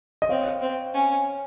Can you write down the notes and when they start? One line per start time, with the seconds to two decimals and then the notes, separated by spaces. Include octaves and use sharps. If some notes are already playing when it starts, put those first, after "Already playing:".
0.22 D#5
0.29 C4 C#5 F5
0.61 C4
0.94 C#4